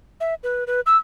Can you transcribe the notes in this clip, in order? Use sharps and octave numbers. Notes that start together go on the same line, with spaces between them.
E5
B4
B4
E6